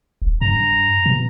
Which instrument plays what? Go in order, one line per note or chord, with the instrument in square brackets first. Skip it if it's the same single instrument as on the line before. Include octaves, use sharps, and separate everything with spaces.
[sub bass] D#1
[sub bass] G2 [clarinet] A#5
[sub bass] B2